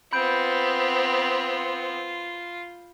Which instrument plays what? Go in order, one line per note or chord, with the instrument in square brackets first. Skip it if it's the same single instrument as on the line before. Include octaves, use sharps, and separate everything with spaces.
[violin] B3 C4 [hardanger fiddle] F4 [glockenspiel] B5 G6 D7